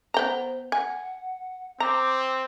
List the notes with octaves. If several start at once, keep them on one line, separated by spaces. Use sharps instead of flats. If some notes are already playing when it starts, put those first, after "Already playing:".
B3 C5 G5 A#5
F#5 G#5
C4 A#5 D6